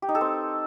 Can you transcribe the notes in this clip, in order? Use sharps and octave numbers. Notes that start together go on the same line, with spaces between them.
G4
D#4
A4
C4